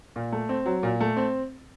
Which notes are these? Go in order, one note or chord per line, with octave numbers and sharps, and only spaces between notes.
A#2
A3
C4
F#3
A#2
A3
C4